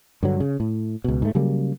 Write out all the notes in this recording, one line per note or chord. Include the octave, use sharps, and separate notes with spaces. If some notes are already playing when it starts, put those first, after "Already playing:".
G2 D3 F#3
C#3
A2
C#2 B2
G#2 A3
C#3 F#3 G3 A#3